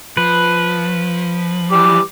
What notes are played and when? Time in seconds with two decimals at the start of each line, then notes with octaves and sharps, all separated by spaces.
0.17 F3 B4
1.71 E3 G3 D6